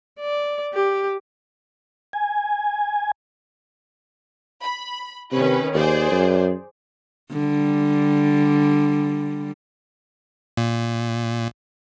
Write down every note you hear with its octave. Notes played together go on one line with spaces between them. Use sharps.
D5
G4
G#5
B5
C3 D#3 C#4 B4
D#2 G#4 C5 D5
F#2
D3 G3
A#2